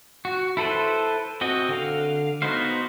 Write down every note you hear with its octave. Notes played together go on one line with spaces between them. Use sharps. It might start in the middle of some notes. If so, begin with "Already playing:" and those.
F#4
E4 A4 B4 C5
C4 F#4 D#5
D3 F5
B3 D#4 F#4 C5 F5